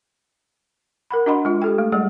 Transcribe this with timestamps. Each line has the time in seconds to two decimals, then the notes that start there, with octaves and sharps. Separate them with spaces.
1.11 A#4 F#5 B5
1.26 D4 F#4 D#5 F#5 B5 C6
1.45 G#3 F4
1.62 G4 A4 G5
1.78 A3
1.92 G3 G#3 G#4 D5 F#5